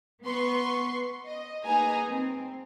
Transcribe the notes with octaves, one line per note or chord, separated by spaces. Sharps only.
B3 B4 C6 C#6
D#5
A#3 D#4 G#4 B4 G#5 A#5
C4